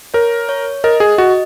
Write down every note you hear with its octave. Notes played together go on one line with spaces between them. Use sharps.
A#4 C#5
C#5
A#4 D#5
G#4
F#4 D#5